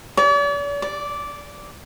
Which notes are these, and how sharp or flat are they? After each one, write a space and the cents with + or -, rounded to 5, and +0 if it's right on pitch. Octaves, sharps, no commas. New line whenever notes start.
D5 -45
D5 -10